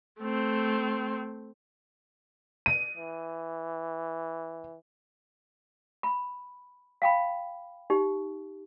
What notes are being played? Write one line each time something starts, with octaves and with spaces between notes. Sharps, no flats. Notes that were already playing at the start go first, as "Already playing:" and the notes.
A3 C4
D#7
E3
B5
F5 G5 B5
D#4 G4